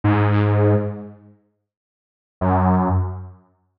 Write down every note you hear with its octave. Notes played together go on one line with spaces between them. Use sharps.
G#2
F#2